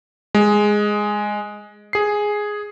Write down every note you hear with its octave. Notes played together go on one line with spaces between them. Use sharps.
G#3
G#4 C7